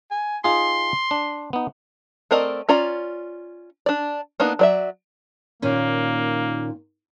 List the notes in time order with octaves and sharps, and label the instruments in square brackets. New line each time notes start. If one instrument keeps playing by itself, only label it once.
[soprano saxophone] G#5
[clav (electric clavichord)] D#4 F4 G#4 [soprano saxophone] C6
[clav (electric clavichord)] D4
B3 D#4
[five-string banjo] A3 C4 A#4 D5 D#5
C#4 F4 D5 A#5
D4 D5
A#3 B3 D4 D#4
F#3 D5 E5
[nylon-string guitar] A#2 D#3 C#4 [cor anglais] A#3